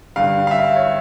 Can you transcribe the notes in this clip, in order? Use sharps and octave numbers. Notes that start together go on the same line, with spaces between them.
G2 D3 F5
F5
E5
C#5